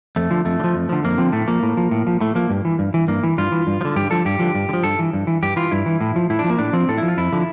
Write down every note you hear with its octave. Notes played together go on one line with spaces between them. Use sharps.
F2 A3
D3 F3
F2 A3
D3
F3
F2
D3 F3
F2 A#3
D3 F3 C4
A2 A3
F3 A#3
A2
F3
A2
F3
A2 A3
F3 A#3
G2
E3
G2
E3
G2 A#3
E3
G2 F4
E3
G2
F3
D3
G2 G4
D3 F3 A4
G2 G4
D3 F3
G2
D3
F3
G2 A4
E3
G2
E3
G2 G4
E3 F4
G2 E4
E3
A2
F3
A2 E4
D4
F3
A#3
A2 D4
F3 C4
A2 A4
E4
F3
F4
F2 E4
D3 F3